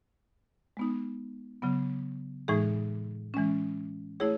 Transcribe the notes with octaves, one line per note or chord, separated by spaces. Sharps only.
G#3 B3 D#4
C#3 F#3 B3
A2 E3 G#3 D#4 G#4
E3 G#3 C#4
A3 E4 G#4 C#5